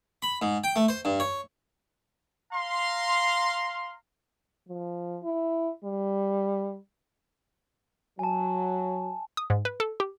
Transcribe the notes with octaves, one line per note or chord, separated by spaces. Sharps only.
B5
G#2
G5
A3
C5
G2
C#5
F5 A#5 C6
F3
E4
G3
F#3 G#5 A5
D#6
G#2
B4
A4
G4